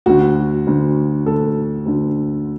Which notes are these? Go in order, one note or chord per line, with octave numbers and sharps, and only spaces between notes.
D2 D3 F#4
D2 D3
D2 D3 A4
D2 D3